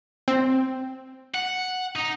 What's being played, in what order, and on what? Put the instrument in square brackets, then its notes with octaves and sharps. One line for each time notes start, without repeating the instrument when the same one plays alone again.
[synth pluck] C4
[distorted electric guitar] F#5
D#4